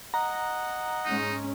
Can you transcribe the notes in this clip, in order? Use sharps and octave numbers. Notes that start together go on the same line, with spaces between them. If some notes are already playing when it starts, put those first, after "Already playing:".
D#5 F#5 A#5
G#2 G#3 C#4 D#4